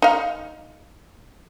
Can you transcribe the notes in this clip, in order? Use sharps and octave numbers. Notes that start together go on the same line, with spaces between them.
D#4 F5